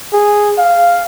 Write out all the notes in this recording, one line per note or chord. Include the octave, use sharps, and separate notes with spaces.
G#4
F5